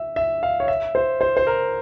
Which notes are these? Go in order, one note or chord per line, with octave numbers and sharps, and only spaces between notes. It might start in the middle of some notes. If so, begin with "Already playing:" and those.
Already playing: E5
E5
F5
C#5
E5
C5
C5
C5
A#4